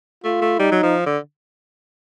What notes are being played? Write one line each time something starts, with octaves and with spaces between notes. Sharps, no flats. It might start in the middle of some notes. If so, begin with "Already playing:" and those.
A3 F4
A3
G3 D#4
F#3
F3
D3